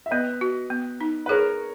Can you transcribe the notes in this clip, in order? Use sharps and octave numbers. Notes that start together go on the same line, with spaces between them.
E5
B3 B4 D#5
F#4
B3
D#4
B4
G#4 A#4 C#5